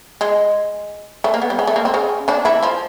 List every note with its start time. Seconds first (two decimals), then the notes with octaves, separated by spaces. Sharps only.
0.21 G#3
1.24 A3
1.34 A#3
1.42 B3
1.50 G3
1.59 G#3
1.67 A3
1.76 A#3
1.85 C4
1.94 C#3 C#4
2.28 D3 D4
2.45 E3 E4
2.63 F3 F4